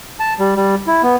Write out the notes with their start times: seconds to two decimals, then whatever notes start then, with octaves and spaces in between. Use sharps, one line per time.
0.20 A5
0.39 G3
0.56 G3
0.87 E4
1.03 B3